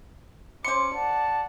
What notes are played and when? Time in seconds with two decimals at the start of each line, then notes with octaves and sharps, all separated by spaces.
0.65 C#4 C5 C6 D6 C#7
0.95 D5 F#5 A5